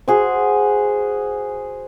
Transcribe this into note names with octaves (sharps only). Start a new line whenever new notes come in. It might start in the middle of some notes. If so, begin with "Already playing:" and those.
F#4 G#4 C5